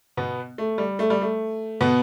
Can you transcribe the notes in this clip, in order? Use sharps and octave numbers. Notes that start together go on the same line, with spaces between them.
B2 B3
A3
G3
A3
G3
A3
B2 B3